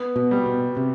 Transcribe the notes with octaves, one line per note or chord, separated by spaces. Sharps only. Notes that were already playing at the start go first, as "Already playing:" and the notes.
Already playing: B3
B2
G3
B2
C3